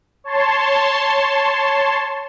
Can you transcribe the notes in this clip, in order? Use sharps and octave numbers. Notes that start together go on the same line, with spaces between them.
C#5 A5 C6